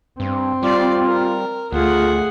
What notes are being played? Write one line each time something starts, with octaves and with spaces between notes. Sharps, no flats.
G2 C4
G3 F4 D5 C6
A#4
D2 A3 F4 G#4 F#5